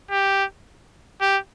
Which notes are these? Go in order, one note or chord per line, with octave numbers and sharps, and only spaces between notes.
G4
G4